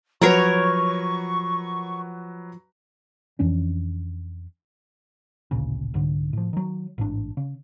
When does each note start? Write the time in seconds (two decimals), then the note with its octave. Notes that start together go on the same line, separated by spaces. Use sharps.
0.22 F3 F#3 F#4 A#4 B4 C#5 A#5 C#6
3.39 F2 E3 C#4 D4
5.51 A1 D2 A#2 C#3
5.94 C2 G#2 D3
6.33 A2 F3
6.53 D#3 F#3
6.98 A1 G#2 D4
7.37 C#3